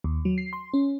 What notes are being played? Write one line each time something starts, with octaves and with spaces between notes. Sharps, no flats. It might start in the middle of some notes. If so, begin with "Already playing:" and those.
D#2
F#3
C7
C6
C#4